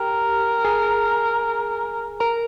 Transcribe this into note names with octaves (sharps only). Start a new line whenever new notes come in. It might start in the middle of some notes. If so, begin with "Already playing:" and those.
Already playing: G4 A#4 G5
G#4 G#5
A#4 A#5